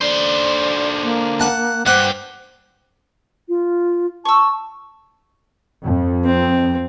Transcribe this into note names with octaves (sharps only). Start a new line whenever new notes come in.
D3 C5 D5
A#3
F#5 A5
G2 G4 C5 F#5
F4
A5 C#6 E6
F2
C4